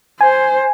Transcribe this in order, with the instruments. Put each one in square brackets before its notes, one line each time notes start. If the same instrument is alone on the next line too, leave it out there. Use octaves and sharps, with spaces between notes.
[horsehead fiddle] C5 [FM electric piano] G#5